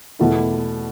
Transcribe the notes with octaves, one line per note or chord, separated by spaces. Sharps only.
E2 B2 A3 E4